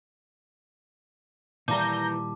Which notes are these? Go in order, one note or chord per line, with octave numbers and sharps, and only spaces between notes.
A#2 D#3 E3 G3 A5 A#5 D6 G6